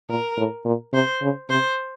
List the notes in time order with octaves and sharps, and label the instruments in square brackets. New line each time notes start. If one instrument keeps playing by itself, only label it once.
[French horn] A#2 [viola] A#4
[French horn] A2
A#2
[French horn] C3 [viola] C5
[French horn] C#3
[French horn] C3 [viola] C5